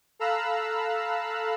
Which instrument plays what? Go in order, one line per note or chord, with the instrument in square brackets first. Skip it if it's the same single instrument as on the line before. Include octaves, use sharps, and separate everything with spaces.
[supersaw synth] A4 F5 A#5 B5 E6 F#6